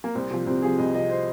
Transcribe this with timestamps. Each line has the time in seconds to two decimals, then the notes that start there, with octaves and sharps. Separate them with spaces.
0.04 A#3
0.15 C2 C4
0.30 C3 F3
0.46 C2 C4
0.62 C3 F3 G#4
0.79 C2 D#5
0.95 C3 F3 D#5
1.10 C5